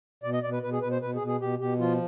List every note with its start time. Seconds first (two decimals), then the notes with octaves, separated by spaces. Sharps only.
0.23 B2 D5
0.33 D#5
0.43 B2 D5
0.52 B4
0.63 B2 B4
0.73 G#4
0.82 B2 B4
0.91 C5
1.02 B2 B4
1.15 G#4
1.21 B2
1.27 G#4
1.40 B2 G4
1.60 B2 G4
1.79 F3 F4